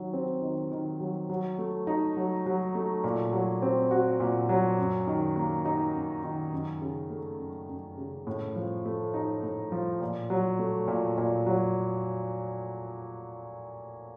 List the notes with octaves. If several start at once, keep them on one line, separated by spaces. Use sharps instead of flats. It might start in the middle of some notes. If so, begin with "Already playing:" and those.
Already playing: D#3 F#3
C4
D#3
D#3
F#3
F#3
A3
D#4
F#3
F#3
A3
A#2
F#3
C4
F#4
A#2
F#3
F#2
D#3
A#3
D#4
F#2
D#3
F#2
C#3
A3
F#2
F#2
C#3
A2
F3
A3
D#4
A2
F3
A#2
F#3
A3
A#2
A#2
F#3